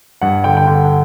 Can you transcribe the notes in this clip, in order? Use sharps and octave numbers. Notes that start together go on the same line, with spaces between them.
G2 F#5
D3 G5
G5
D3 F#5
F#5